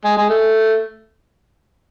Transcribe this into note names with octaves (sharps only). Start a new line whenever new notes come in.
G#3
G#3
A3